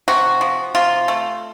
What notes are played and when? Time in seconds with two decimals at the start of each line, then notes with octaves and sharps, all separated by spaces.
0.08 C3 F#4
0.41 F3
0.75 C3 F4
1.08 A3